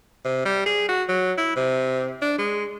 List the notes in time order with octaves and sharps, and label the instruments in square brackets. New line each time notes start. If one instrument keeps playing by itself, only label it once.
[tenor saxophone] C3
G3
G#4
F#4
F#3
E4
C3
D4
G#3